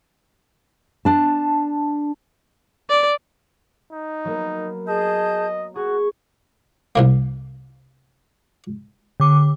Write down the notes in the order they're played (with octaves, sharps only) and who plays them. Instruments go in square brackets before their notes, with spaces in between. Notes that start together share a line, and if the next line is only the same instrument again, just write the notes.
[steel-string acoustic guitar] D4 A5
[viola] D5
[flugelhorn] D#4
[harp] F#3 A#3 B3
[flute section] G#4 A5 G6 [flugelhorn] D#5
[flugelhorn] F#4 [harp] G#4 [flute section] C#6
[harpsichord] C2 C3 A#3
[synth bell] D3 D6